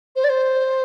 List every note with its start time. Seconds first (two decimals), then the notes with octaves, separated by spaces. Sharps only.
0.16 C5
0.24 D5
0.29 C5